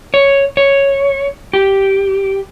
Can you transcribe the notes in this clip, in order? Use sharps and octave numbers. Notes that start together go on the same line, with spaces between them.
C#5
C#5
G4